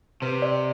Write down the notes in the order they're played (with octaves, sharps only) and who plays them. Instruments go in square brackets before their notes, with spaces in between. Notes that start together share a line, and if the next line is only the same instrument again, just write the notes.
[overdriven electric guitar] C3 [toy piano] B4
[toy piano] D5